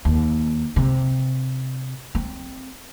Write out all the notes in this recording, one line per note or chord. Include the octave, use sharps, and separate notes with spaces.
D#2
C3
C4